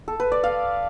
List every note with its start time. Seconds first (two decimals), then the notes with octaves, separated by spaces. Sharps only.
0.08 A4
0.20 B4
0.32 D5
0.44 F5